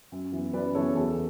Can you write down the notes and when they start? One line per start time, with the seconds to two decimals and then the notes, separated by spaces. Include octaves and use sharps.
0.12 F#2
0.32 E3 B3
0.53 F#2 B4 D5
0.75 C#3 E3 B3 A4 C#5
0.96 E2 A4